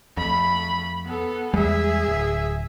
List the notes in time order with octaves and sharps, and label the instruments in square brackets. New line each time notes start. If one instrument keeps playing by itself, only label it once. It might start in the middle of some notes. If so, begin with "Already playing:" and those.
[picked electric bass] F2 [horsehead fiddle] A3 B5
[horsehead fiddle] B3 A4
[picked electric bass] E2 G3 G#3 [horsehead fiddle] G#4 E5
[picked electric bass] D1